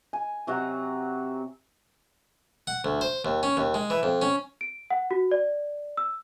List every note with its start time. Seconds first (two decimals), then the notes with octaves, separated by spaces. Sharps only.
0.13 G#5
0.47 C3 F#3 F#4 F#5
2.67 F#5
2.84 D2
3.01 C5
3.25 D#2
3.43 C#4
3.57 D#2
3.74 G#3
3.90 E3
4.03 F2
4.22 C#4
4.61 D7
4.90 F#5
5.11 F#4
5.31 D5
5.97 E6